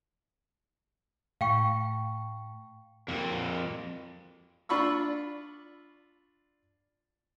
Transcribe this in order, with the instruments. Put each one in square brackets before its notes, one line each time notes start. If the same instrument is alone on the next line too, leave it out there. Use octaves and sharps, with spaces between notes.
[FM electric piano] A2 [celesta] F5 G5 C#6
[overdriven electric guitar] F2 A#3
[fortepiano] D4 F4 B5 C#6 E6